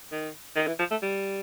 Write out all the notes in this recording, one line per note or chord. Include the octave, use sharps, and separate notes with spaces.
D#3
D#3
E3
F3
A3
G3